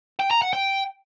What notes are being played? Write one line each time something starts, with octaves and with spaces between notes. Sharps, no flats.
G5
A#5
F#5
G5